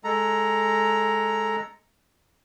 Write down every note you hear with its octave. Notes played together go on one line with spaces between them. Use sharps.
G#3 A4 A#5